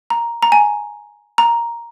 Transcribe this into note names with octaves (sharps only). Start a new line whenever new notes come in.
A#5
A#5
G#5
A#5